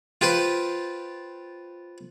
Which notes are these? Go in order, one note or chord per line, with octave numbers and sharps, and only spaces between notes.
F4 G4 B4 C5